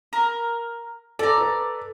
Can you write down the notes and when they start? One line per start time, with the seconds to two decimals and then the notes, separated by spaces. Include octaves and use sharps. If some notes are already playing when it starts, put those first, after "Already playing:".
0.13 A#4
1.19 A4 D5 A#5
1.38 A4 B4